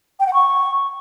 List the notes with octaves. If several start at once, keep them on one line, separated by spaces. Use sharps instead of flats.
G5
F#5
C#6